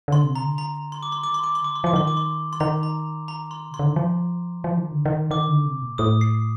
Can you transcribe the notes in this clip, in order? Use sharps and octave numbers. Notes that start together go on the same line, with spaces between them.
D3 C6
C3
A#5
D3
A#5
C6
D6
C6
D#3 D6
C6
D6
D3 C6
D6
C6
F3 D6
D#3 C6
D6
C6
C6
D#3 A#5
A#5
A#5
C6
C3 C6
D3
D#3
F3
F3
D#3
D3
D#3
D#3 D6
D3
C3
A#2
A2 D#6
C7